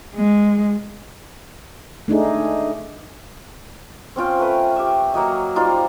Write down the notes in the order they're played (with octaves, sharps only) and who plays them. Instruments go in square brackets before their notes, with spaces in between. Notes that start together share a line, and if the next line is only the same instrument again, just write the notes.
[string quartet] G#3
[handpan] A3 D4 D#4 G#4
[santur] C4 C#4 F4 G5
A3 B4
G4 E5
F#3 A#3 F#4 D#5
G3 D#4 F4 C5